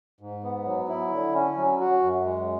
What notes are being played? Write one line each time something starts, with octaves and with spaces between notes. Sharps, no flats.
G#2
B3
F#3
E4
D3
C#4
F#3
F#4
F#2
G#3